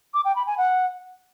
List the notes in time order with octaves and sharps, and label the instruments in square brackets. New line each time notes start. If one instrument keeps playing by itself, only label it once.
[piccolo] D6
G5
B5
G#5
F#5